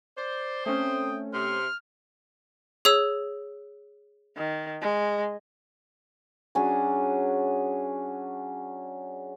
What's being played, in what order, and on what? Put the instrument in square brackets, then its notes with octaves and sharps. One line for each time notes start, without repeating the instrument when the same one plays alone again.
[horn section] C5 [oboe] D5
[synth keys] A3 C4 C#4 [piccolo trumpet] G5 [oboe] D#6
[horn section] C3 [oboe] C6 [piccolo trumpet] F6
[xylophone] G#4 C#5 E6
[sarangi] D#3
G#3
[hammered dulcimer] F#3 C#4 D4 G#4